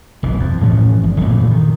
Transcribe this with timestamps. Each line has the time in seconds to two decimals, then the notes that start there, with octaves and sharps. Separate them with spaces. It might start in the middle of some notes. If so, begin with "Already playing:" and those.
0.23 F1 B1 E3
0.40 F2
0.61 A2 E3 F3 C#4
1.03 G#1
1.21 F2 A#2 E3 A3
1.51 D#3